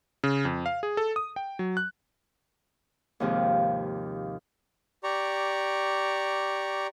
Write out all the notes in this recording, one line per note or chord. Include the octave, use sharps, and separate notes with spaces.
C#3
F2
F5
G#4
A4
D#6
G5
F#3
F#6
D#2 G#2 C3 F3
G4 D5 A#5 C#6